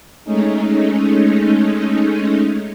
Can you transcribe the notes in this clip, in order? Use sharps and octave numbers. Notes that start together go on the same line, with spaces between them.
G#3 A3 C#4 D#4